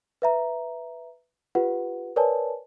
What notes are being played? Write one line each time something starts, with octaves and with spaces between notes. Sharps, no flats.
B4 E5 A#5
F4 G4 B4 F#5
A#4 B4 C#5 D5 G#5 A5